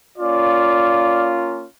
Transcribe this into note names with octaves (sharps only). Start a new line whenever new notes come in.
A#3 C#4 F4 D5